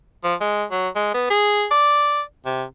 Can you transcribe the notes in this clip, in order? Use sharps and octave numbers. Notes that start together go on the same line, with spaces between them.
F3
G#3
F#3
G#3
B3
G#4
D5
C3